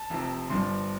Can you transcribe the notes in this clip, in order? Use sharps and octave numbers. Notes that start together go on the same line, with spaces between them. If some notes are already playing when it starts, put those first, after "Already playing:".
Already playing: A5
F1 F2 C3 F3
G1 G2 F3 C6